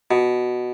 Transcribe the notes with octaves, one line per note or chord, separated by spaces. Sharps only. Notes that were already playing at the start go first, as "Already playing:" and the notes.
B2